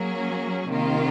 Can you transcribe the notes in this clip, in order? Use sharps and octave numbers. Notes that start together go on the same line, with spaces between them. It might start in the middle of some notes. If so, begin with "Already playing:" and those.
Already playing: F#3 A#3 C#4 G#4
C3 D#3 A#3 F4